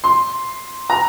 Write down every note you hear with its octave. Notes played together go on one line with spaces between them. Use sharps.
C6
A#5